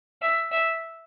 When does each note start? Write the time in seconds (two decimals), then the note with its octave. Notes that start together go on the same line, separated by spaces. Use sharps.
0.22 E5
0.52 E5